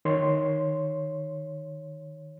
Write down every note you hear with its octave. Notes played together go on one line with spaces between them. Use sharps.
D#3 C#5 C6